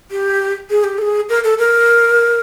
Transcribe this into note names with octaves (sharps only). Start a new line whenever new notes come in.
G4
G#4
G4
A4
G#4
A#4
A4
A#4